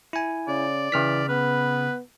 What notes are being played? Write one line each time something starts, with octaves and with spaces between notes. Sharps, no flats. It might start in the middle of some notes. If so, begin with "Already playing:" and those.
E4 G#5
C#3 D5
C#3 E3 F6 B6
B3 B4